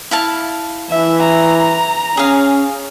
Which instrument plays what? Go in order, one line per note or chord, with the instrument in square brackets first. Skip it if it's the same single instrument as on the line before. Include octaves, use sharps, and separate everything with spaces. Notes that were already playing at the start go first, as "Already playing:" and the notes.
[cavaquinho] E4 F5 A5
[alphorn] E3 [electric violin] E5
[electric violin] A#5
[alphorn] C#4 [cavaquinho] G#4 F5